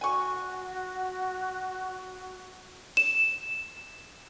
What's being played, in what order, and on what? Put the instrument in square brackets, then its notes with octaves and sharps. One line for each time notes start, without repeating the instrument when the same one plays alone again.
[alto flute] F#4 [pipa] G#5 C#6
[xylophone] E7